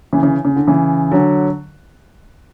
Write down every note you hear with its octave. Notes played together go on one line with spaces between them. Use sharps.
C#3 E3
C#3 E3
C#3
D3
C#3 E3
D3 F#3